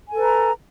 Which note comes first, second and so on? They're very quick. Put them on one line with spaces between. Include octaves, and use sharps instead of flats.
G#5 A4 B4 A#5